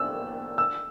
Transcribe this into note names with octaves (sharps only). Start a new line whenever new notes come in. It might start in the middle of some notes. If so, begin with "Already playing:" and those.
Already playing: E6
E6